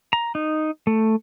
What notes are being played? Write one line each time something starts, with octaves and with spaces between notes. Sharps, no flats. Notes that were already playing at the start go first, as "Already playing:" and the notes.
A#5
D#4
A3